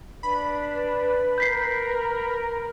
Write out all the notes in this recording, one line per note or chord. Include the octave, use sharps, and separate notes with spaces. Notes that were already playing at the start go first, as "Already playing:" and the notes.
D4 B4 B5
A#4 G6 B6 C7